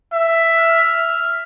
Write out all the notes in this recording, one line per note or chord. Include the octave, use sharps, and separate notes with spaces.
E5
F6